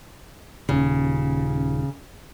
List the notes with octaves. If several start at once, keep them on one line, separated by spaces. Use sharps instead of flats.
D#1 C#3